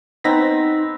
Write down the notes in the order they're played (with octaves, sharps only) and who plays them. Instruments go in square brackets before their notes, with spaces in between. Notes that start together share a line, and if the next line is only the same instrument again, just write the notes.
[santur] B3 C4 [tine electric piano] D#4 A#6 B6